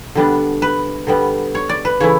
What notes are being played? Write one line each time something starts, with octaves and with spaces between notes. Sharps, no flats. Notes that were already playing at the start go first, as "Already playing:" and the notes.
Already playing: B2
D3 G3 B3 D4
B4
D3 G3 B3
C#5
D5
B4
C#3 E3 A3 E4 C#5